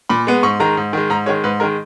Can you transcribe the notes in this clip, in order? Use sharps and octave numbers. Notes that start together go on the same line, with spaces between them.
A#2 B5
G#3 B3
G#2 C#6
D#3 G#3 A#5
G#2
D#3 G#3
G#2 A#5
D#3 G#3 C#5
G#2 B4
D#3 G#3 A#4